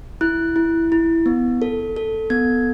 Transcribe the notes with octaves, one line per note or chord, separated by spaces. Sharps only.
E4 F#6
E4
E4
B3
A4
A4
B3 G#6